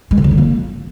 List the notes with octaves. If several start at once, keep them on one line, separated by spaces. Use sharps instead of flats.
G#3
D3
D#3
D3
A#3